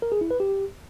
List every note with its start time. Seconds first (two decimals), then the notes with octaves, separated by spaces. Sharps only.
0.02 A#4
0.12 G#4
0.21 E4
0.31 B4
0.40 G4